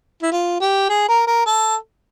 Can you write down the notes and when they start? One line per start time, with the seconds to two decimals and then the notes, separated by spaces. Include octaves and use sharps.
0.22 E4
0.32 F4
0.61 G4
0.89 G#4
1.09 A#4
1.27 A#4
1.46 A4